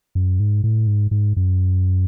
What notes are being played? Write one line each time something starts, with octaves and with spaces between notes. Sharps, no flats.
F#2
G#2
A2
G#2
G#2
F#2